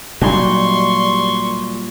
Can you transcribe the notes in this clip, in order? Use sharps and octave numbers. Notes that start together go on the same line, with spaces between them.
A#2 F#3 G3 D4 D#4 C6 C#6